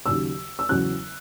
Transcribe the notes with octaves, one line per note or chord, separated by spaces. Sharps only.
D#2 C#3 F#3 E6
E6
E2 C#3 F#3 C#4 F#6